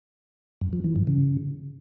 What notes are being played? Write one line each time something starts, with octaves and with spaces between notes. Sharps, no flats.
F#2
F3
E3
G2
C#3